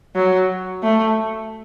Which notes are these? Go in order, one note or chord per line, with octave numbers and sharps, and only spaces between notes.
F#3
A3